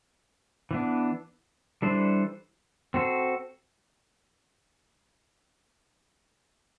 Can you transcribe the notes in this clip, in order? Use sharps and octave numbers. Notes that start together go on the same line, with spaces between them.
E3 B3 D4
E3 G3 D4 A4 C5
C4 F#4 A4 C5